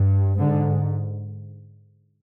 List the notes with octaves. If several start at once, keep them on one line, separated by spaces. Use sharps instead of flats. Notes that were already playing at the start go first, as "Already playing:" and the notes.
Already playing: G2
G#2 D3